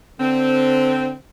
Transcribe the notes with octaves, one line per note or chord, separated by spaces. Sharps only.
D3 C4